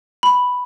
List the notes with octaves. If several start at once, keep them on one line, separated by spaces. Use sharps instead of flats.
B5